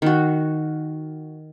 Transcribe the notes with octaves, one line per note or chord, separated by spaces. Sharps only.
D#3 F#4